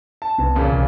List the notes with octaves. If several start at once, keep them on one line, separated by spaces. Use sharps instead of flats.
A5
C2 B3
E2 A#2 C#3
C2 C3